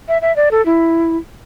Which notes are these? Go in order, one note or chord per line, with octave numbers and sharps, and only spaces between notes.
E5
E5
D5
A4
E4